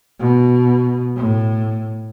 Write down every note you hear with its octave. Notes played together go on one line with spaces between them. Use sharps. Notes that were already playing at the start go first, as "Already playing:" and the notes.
B2
A2